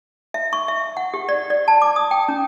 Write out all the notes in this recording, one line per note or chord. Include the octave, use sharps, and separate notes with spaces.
E5
C#6
E5
F#5
G4
D5
D5
A5
D6
D#6
G5
C#4